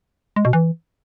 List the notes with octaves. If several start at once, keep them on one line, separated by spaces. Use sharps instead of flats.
G#3
B2
E3